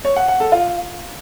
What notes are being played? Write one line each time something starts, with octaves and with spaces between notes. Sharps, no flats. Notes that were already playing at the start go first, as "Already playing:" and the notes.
C#5
F#5
F#5
A4
F4